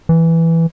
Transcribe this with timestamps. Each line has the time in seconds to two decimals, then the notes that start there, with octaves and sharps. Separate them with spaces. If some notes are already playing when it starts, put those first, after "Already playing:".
0.09 E3